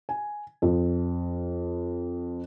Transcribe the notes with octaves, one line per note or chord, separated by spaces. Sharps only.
G#5
F2